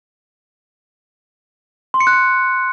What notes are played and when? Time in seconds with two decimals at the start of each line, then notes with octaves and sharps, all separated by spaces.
1.94 C6
2.00 C#7
2.07 F#6
2.13 C#7